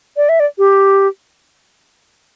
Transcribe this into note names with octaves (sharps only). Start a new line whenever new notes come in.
D5
E5
D5
G4